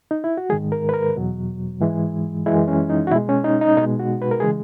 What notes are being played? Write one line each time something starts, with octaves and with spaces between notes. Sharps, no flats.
D#4
E4
F#4
G#2 D#3 G#3 G#4
A#4
B4
A#4
E2 B2 F#3
G#2 E3 G#3
F#2 E3 G#3 E4
C#4
D#4
F#4
B2 G#3 E4
C#4
D#4
D#4
B2 G#3 D#4
F#4
B4
A#4
C#3 E3 G#3 G#4